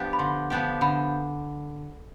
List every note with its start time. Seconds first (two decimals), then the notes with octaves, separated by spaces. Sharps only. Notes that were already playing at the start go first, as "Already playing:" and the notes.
Already playing: F3 B3 D4 G4
0.13 B5
0.19 D3 C6
0.50 F3 B3 D4 G4
0.81 D3 B5